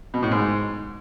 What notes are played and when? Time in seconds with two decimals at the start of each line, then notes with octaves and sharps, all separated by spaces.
0.14 B2
0.23 A2
0.31 G#2